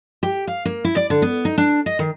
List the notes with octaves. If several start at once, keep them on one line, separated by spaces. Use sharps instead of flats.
G4
F5
A#3
E4
D5
D3
B3
D#4
D4
D#5
D#3